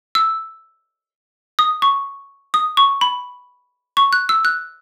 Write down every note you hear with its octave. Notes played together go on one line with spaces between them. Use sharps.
E6
D#6
C#6
D#6
C#6
B5
C#6
F#6
E6
F#6